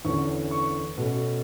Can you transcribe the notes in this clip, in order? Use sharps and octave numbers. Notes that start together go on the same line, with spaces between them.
E2 D3 A3 C#4 C#6
C#6
B2 A3 C#4